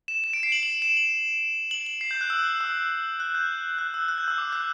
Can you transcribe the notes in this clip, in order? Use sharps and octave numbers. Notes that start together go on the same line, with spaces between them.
E7
E7
D7
C7
F#7
F#7
E7
F#7
F#7
F#7
C7
G6
F#6
E6
E6
F#6
G6
F#6
E6
F#6
G6
E6
D6
F#6